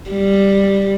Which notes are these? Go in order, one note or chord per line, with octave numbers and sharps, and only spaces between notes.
G3